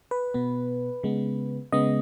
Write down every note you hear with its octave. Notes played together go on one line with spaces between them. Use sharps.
B4
B2 B3
C#3 G#3 B3
C#3 G#3 B3 D#5